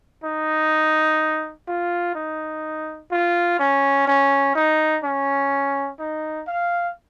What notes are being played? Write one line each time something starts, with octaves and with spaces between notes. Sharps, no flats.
D#4
F4
D#4
F4
C#4
C#4
D#4
C#4
D#4
F5